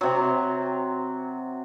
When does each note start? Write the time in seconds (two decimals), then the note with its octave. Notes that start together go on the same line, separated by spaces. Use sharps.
0.01 C3 F#3